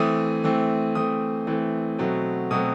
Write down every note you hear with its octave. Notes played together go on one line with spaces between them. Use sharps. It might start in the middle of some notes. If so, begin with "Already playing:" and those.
Already playing: E3 A3 C4 D#6
E3 A3 C4
E3 A3 C4 D#6
E3 A3 C4
B2 F#3 A3 C4
B2 F#3 A3 C4 D#6